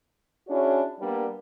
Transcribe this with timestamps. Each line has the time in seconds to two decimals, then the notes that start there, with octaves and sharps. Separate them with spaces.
0.48 C#4 D4 E4 F#4 G#4 C#5
1.00 G3 A#3 B3 D4